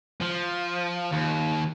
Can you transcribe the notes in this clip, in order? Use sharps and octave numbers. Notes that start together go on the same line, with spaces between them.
F3
D#2